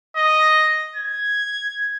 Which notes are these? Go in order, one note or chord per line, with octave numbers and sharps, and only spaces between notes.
D#5
G#6